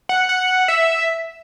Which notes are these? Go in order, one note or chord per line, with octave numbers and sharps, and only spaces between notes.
F#5
F#5
E5